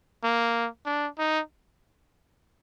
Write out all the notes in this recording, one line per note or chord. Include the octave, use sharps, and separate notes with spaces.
A#3
D4
D#4